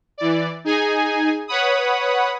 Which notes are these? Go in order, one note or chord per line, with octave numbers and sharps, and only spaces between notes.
E3 D5
D#4 G#4 G#5
B4 C#5 F#5 B5 D#6